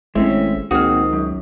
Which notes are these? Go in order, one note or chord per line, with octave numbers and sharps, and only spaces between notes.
G#1 A2 G#3 C4 C#4 E5
C#2 A#2 D#3 C4 F#4 G#4 F6
F#2